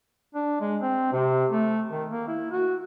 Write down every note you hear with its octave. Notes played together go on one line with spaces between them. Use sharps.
D4
G#3
C4
C3
A3
D#3
A#3
E4
F#4